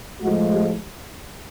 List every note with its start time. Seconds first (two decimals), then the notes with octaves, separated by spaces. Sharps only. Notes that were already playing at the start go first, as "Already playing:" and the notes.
0.21 A2 F3 G#3 F#4
0.51 G4